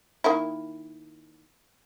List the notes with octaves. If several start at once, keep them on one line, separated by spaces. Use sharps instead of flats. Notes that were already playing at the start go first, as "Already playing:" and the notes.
D#3 A#3 E4